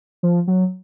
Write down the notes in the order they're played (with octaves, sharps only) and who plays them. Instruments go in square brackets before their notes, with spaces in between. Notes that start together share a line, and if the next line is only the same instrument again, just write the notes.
[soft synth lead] F3
F#3